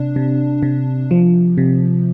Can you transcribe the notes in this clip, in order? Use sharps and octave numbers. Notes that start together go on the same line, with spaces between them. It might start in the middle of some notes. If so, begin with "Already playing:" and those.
Already playing: C3 D4
C3
C3
F3
C3